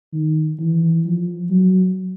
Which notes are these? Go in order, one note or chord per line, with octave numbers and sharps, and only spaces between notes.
D#3
E3
F3
F#3